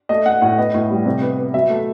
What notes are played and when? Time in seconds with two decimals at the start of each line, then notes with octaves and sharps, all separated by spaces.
0.09 A3 D#5
0.25 A3 F#5
0.41 A2 F#5
0.58 B3 D#5
0.74 A2
0.90 G3
1.06 C3
1.22 B3
1.38 B3
1.54 F#3 E5
1.70 A3